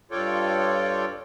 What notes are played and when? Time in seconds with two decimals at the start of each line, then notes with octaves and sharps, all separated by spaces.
0.11 G2 F4 A4 C#5 D5 G5